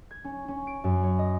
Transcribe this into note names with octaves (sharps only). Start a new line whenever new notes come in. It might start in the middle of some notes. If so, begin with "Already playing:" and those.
G#6
C#4
C#4
D7
F#2
C#5
D#5